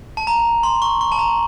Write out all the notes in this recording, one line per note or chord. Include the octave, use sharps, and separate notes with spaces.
A5
A#5
C6
C#6
C#6
A5
A#5